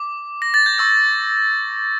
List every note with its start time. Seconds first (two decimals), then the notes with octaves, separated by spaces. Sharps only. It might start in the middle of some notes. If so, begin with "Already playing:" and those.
Already playing: D6
0.42 A#6
0.54 A6
0.66 G6
0.78 C#6 E6 G6